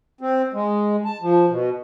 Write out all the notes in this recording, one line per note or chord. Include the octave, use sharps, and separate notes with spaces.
C4
G#3
A5
F3
B2